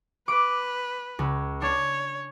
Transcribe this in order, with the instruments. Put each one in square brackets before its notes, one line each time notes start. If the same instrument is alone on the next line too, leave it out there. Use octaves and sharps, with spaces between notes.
[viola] B4 [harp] D6 D7
[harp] C#2
[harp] D4 [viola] C#5